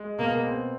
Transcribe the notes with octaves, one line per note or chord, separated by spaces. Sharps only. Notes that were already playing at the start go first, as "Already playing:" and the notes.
Already playing: G#3
B2 A#3
C4